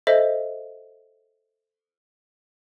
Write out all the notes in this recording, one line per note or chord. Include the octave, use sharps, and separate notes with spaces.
A4 C5 D#5 E5